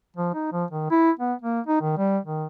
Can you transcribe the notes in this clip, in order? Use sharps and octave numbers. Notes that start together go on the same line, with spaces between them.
F3
D#4
F3
D#3
E4
B3
A#3
D#4
D#3
G3
D#3